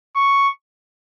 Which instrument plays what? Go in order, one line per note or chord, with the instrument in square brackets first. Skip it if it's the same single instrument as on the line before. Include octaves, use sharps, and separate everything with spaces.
[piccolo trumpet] C#6